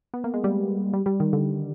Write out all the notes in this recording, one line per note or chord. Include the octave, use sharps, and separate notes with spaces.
B3
A#3
G#3
G3
G3
G3
D#3
D3